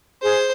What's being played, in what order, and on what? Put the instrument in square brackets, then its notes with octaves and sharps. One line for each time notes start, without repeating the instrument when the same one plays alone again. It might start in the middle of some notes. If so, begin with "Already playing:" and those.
[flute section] G#4 [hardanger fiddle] C5